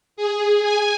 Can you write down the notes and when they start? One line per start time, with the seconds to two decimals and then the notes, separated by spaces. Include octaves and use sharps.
0.17 G#4
0.62 G#5